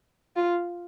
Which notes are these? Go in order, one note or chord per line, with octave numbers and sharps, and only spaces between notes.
F4